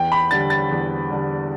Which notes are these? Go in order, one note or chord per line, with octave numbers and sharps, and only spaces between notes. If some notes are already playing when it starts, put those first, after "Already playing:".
Already playing: E2 G5
B5
D3 G3 A6
A6
E2
D3 G3